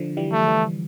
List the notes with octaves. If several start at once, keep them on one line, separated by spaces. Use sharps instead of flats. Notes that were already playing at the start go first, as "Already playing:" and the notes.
Already playing: D3 F3
E3 G3
A3
E3 G3